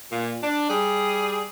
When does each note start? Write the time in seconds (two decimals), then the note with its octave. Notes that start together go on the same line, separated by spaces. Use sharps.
0.12 A#2
0.43 D4
0.70 G3 G#4